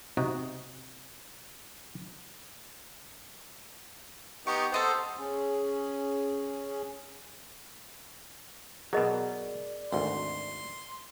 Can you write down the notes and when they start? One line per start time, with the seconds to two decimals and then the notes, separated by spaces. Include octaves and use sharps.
0.17 C3 D#4 F#4
4.47 B3 D#4 G4 C#6
4.72 B3 D#4 A4 C5
5.17 C#4 G#4
8.93 B2 F#3 G#4 A#4 D5 D#5
9.92 G#1 D2 C6